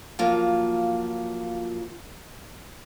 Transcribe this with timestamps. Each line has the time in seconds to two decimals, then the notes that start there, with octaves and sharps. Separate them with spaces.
0.19 F3 F#3 A#3 F4